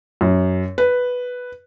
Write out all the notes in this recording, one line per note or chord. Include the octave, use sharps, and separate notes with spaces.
F#2
B4